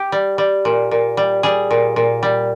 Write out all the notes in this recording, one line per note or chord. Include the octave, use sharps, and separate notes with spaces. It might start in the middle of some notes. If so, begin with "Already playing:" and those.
Already playing: G4
G3
G3
A#2
A#2
G3
G3 G#4
A#2
A#2
G3